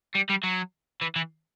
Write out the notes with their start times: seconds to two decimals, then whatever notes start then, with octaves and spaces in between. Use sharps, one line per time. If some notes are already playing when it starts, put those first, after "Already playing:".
0.15 G3
0.30 G3
0.44 F#3
1.02 E3
1.16 E3